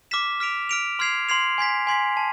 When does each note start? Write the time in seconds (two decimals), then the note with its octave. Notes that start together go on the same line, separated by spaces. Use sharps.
0.11 D6 F6 B6 E7
0.40 F6 B6 D7 F7
0.69 F6 B6 D7 F7
0.99 C6 F6 G#6 C7 F7
1.29 C6 F6 G#6 C7 F7
1.58 G#5 C6 G#6 B6
1.87 G#5 C6 G#6 B6
2.17 A5